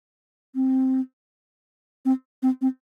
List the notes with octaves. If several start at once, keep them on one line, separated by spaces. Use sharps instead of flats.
C4
C4
C4
C4